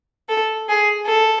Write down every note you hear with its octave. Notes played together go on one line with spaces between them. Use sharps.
A4
G#4
A4